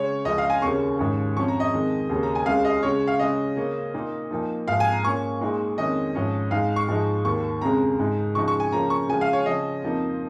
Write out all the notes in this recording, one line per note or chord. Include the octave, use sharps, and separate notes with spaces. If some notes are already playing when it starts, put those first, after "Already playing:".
Already playing: C#3 G#3 C#4 C#5
C#2 C#3 F3 G#3 C#4 D#5
F5
G#5
D#2 C#3 A#3 C#4 C#6
G#2 D#3 C#4
F2 F3 C#4 C#6
A#5
D#5
F2 D#3 G#3
D#2 C#3 A#3 C#4
A#5
G#5
C#2 C#3 G#3 C#4 F5
D#5
C#3 G#3 C#4 C#5
F5
C#3 G#3 C#4 D#5
C#3 A#3 C#4
A#2 A#3 D#4
A#2 F3 A#3 D#4
G#2 F3 G#3 F5
G#5
A#5
A#2 A#3 C#4 C#6
A#2 G#3 D#4
F2 D#3 G#3 C#4 D#5
G#2 F3 C#4
G#2 G#3 D#4 F5
C#6
G#2 F3 G#3 D#4
D#2 D#3 A#3 C#6
F2 C#3 G#3 A#5
G#2 G#3 D#4
C#3 F3 G#3 D#4 C#6
C#6
G#5
C#3 F3 A#3 C#4 A#5
C#6
C#3 F3 G#3 G#5
F5
C#5
C#3 F3 C#4 D#5
F2 F3 A#3 D#4